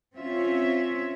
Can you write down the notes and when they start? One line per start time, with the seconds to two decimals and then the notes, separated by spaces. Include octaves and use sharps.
0.14 C4 C#4 F4 E5